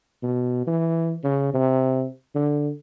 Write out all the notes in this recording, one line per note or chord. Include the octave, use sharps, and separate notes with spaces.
B2
E3
C#3
C3
D3